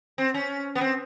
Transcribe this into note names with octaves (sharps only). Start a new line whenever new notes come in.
C4
C#4
B3
C4